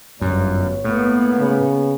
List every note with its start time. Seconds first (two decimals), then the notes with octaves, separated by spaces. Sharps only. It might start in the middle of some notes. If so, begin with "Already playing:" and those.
0.21 G1 F#2 A2 C#5
0.84 A2 A#3 B3
1.39 C#3